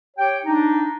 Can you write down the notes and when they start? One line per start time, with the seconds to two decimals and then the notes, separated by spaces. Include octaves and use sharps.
0.17 G4 C#5 G5
0.45 D4 D#4